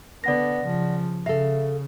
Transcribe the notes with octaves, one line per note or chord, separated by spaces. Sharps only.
D3 B3 D5 F#5 A#6
C#3 F3
C#3 A4 E5 F5